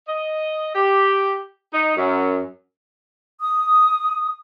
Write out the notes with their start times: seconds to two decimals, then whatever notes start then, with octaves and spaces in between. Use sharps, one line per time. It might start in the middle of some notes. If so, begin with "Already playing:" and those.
0.08 D#5
0.75 G4
1.73 D#4
1.96 F#2
3.40 D#6